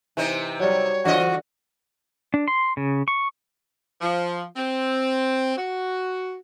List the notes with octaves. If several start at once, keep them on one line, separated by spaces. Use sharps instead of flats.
C3 E3 C4 D#4
F#3 G3 C#5
D3 E3 F4 F#4 D#5
D4
C6
C#3
C#6
F3
C4
F#4